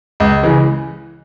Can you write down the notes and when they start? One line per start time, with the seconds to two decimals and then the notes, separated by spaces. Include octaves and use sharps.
0.20 C#2
0.43 C#3 E3 G#3